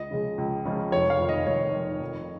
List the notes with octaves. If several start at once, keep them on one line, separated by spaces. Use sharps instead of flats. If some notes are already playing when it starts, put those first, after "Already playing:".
Already playing: C#2 D#5
C#3 F3 G#3
C#2
C#3 F3 G#3
F1 C#5
F5
F2 D#3
D#5
F1 C#5
F2 D#3
F2